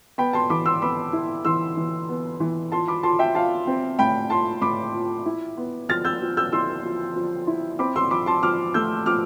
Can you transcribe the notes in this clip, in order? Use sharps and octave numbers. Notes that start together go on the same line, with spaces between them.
B3 G5 B5
A5 C6
E3 B5 D6
C6 E6
B3 B5 D6
E4
E3 C6 E6
E3
B3
E3
F4 A5 C6
B5 D6
F4 A5 C6
E5 G5
F4 F5 A5
C4
A2 G5 B5
F4 A5 C6
A2 B5 D6
F4
E4
B3
F3 F6 A6
E6 G6
F3
E6 G6
E4 C6 E6
F3
F3
E4
C4 B5 D6
C6 E6
F3 B5 D6
A5 C6
F3 D6 F6
A3 E6 G6
F3 D6 F6